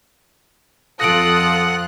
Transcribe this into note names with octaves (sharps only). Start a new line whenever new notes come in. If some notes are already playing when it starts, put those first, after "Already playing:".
F2 F4 A4 F#5 D#6 F#6 A#6 D7